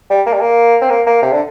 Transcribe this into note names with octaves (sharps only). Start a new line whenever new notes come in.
G3
A#3
G3
A#3
C4
A#3
A#3
C3
D3